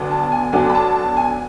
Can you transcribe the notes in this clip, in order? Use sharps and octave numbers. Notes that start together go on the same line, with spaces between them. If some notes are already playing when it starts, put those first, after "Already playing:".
Already playing: D2 D3 F#3 B3 D4
A5
G#5
D2 D3 F#3 B3 D4 G#5
B5
A5
A5
G#5